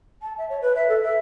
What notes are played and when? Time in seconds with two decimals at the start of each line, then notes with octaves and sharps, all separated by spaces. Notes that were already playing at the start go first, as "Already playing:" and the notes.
0.22 A5
0.38 E5
0.49 C#5
0.61 B4
0.75 E5
0.89 A4
1.03 E5